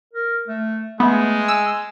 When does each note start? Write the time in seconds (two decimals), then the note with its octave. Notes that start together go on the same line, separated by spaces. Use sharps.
0.14 A#4
0.48 A3
1.00 G#3 A3 B3
1.48 G#5 E6